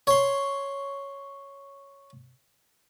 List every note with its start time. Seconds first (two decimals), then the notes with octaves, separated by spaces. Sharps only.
0.07 C#5 C6